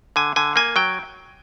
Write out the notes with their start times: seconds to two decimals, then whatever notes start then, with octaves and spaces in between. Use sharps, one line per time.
0.16 D3 G#5
0.36 D3 G#5
0.56 A#3 G#5
0.76 F#3 G5